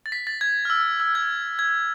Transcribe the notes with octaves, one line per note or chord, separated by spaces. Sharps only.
A6
B6
A6
G#6
F6
E6
E6
G#6
G#6